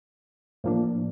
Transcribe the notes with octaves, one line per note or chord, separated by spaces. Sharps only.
A2 F3 A#3 D4